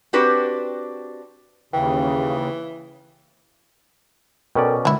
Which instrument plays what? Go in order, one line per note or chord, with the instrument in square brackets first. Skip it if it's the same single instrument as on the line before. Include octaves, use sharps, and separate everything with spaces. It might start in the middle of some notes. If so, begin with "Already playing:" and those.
[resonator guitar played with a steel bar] C4 D4 F#4 G4 B4
[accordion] D#2 C#3 [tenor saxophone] E3 [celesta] G5
[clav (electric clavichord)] B2 C#4 D5 [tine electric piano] A4 A#4 G5
[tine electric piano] D3 G#3 [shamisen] F#3 E4